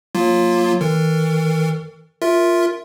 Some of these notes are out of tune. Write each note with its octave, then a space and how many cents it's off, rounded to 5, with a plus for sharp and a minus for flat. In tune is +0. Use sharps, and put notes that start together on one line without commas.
F#3 -35 A#3 +0 F4 +0
E3 -45 A#4 -40
F4 +0 A#4 +0 E5 +0